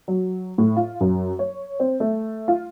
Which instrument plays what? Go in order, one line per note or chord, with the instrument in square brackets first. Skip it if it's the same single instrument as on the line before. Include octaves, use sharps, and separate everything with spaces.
[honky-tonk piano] F#3
A2
F4
F#2
C#5
C4
A3
F4